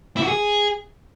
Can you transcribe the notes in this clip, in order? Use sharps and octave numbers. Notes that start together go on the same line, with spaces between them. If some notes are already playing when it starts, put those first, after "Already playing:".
E4
F#4
G#4